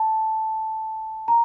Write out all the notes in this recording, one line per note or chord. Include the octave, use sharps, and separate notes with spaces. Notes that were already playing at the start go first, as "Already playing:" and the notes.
Already playing: A5
A#5